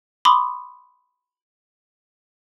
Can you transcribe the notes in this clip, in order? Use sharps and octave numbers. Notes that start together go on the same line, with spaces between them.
B5 C6 D6 D#6